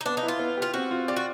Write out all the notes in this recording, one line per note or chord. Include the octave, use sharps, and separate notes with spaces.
D#4
B3 D4
D#4
E4
F4
B3
F4 G4
C4 F#4
F4
G4 D5
F#4